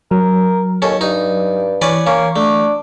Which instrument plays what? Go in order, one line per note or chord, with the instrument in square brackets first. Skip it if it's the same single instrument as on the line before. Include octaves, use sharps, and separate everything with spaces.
[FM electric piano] F#3 [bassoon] A#4
[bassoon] D#2 [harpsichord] C#4 A4
[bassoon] G2 [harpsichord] D#4
[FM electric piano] E3 [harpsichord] C#4 B4 D5
[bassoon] A#3 [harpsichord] C#4
[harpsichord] A3 [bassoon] D4